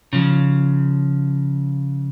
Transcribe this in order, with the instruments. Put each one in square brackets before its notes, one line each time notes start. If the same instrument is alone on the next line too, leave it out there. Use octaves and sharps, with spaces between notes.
[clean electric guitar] C#3 F3